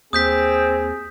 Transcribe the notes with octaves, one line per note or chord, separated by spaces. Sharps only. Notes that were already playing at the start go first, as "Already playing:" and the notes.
D#2 C4 G#4 D#6 G6 B6